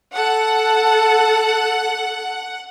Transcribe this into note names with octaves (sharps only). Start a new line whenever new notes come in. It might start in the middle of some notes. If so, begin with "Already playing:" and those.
A4 F#5